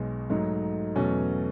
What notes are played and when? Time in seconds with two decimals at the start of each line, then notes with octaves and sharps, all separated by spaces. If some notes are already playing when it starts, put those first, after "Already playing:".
Already playing: B1 B2 G#3
0.30 G#2 F#3 A3 D#4
0.95 E2 B2 F#3 A3 C#4